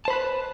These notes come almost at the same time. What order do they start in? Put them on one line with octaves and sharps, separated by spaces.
A5 C5 B5 B4